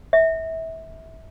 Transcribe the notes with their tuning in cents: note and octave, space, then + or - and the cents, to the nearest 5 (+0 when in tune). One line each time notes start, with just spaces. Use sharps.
E5 -25